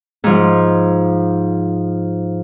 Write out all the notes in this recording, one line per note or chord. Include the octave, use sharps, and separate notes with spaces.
G#2 F3